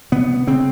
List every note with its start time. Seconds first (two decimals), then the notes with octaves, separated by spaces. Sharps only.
0.12 C3 B3
0.47 C#3 C4